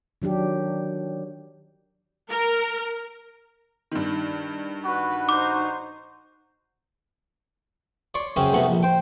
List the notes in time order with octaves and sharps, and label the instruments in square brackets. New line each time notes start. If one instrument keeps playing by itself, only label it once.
[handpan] D#3 F#3 D4 G4
[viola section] A#4
[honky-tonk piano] G2 D#3
[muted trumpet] F#4 [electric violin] B4
[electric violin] D#4 C5 [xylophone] D6
[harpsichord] C#5 D5 C6 C#6
F#2 C#3 C4 C#4 G#4 D#6
B1 C3 A3 B3 F#5 A#5
A#1
C5 G5